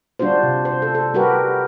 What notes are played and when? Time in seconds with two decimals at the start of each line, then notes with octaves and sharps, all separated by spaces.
0.19 G3 D4 F4 F#4 C5
0.43 C3
0.65 C5
0.82 A4
0.95 A4
1.14 G3 F#4 G4 A#4 B4